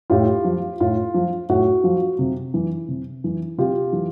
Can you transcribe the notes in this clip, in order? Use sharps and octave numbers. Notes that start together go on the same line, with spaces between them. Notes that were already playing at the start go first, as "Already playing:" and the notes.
A2 F4 G4
F3
A2 F4
F3
A2 F#4
F3
C3
E3
C3
E3
C3 F4 G4
E3